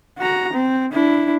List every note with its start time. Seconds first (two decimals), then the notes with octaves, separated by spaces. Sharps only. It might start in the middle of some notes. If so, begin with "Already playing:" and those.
0.18 F#4 A#5
0.54 C4
0.93 D4 E4